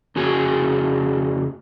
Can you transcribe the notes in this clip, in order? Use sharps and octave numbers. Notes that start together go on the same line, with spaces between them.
F2 C#3 F#4 G#4 G#5